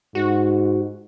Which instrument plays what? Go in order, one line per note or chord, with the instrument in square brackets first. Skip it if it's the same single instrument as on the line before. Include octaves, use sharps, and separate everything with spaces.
[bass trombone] G#2 [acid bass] F#4